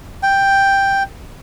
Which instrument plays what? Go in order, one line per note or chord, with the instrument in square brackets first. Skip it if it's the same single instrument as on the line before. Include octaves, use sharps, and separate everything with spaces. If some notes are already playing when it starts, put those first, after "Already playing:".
[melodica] G5